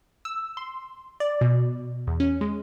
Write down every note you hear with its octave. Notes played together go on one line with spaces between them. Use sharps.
E6
C6
D5
B2
E2
C#4
G#3